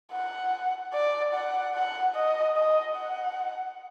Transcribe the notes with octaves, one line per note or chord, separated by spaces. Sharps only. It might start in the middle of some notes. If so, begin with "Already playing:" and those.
F#5
D5
F#5
F#5
D#5
D#5
F#5